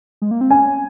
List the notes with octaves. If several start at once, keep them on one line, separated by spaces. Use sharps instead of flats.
G#3
A#3
C4
C#4 G#5